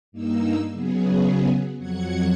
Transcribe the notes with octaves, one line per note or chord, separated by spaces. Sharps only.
G2 A#3 D#4 E6
C#3 F#3 B3 G#4
F2 F#3 F#5 G#6 C#7